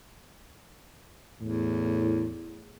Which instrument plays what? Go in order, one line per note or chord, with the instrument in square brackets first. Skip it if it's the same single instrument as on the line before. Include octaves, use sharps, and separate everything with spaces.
[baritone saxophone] E2 [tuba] A2